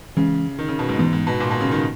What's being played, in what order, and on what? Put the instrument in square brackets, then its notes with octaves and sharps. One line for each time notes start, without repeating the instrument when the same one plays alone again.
[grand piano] C#3 [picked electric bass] E3 G#3 C#4
[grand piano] D#3
C#3
B2
G#2
[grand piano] G#2 [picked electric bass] E3 B3
[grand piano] G#2
B2
A#2
B2
C#3
D#3